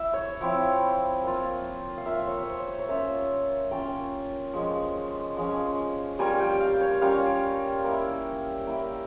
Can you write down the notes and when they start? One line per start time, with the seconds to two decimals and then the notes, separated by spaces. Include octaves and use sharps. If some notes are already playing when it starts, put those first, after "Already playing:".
Already playing: E4 E5
0.13 C#5
0.41 F3 C4 E4
1.23 A#3 F4
1.98 F5
2.06 A#3 F4 E5
2.27 C#5
2.43 C5 C#5
2.68 C#5
2.79 C#5
2.88 A#3 C#4 F4 E5
3.71 A#3 C#4 F4 G5
4.54 F3 G#3 C#4
5.36 F3 G#3 C#4
6.19 G3 A#3 C#4 F4 G#5
6.40 G5
6.60 F5
6.81 C#5
7.01 G3 A#3 C#4 F4 F5
7.84 A#3 E4
8.67 A#3 E4 G5